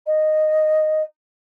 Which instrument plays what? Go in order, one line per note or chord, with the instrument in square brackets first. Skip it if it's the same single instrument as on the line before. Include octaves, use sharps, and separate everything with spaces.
[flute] D#5